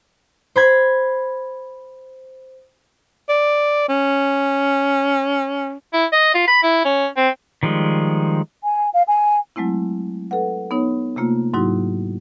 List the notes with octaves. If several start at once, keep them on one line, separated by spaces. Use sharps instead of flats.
C5 B5 G#6
D5
C#4
E4
D#5
F4
B5
E4
C#4
C4
D#3 F3 G3 G#3
G#5
F5
G#5
F#3 G#3 A3 C4 E4
A4 B4 F#5
B3 D#4 C#5
C3 A3 A#3 F4
G#2 F#3 D#4 E4 F#4